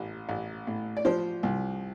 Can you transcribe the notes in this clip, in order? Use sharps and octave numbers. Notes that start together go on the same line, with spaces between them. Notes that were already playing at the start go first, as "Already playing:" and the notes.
Already playing: A1
A1
A2
D5
F3 C5
C2